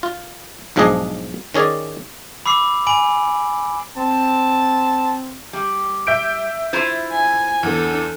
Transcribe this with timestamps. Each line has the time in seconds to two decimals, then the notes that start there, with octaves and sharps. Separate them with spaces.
0.03 F4
0.76 B1 G#2 F3 D4 G#4 D#5
1.54 D#3 C#4 G#4 D5
2.46 B5 D6 E6 C7
2.87 G#5 B5 D7 F#7
3.97 C4 A5
5.53 G3
6.07 E5 G6 D7
6.73 E4 F4 C5
7.12 G#5
7.63 E2 D4 A4